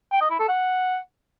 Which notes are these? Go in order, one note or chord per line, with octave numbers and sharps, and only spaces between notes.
G5
D#5
E4
A4
F#5